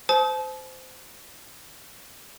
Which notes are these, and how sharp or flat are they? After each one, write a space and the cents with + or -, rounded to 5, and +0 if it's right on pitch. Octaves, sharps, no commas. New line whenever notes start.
C5 -20 A5 -40 D#6 +35